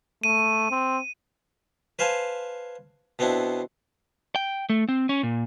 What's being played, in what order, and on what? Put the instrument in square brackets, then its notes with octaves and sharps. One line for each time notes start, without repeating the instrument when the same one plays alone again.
[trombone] A3 [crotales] D#7
[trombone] C4
[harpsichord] B4 C5 F5 G#5 A5
B2 B3 C4 D4 E4
[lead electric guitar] G5
A3
C4
C#4
A#2